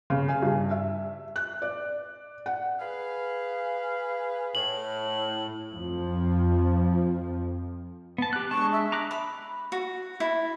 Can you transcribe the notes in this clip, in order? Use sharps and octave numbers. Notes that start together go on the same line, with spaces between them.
C#3
G#4
G2
E5
F#6
D5
F#5
G#4 B4 F5
A2 F#7
F2 F3
B3 A5
G4 F#6
G#3 D4 A5 C#6
E5
A#5 D6 F#6
B5
F#4
E4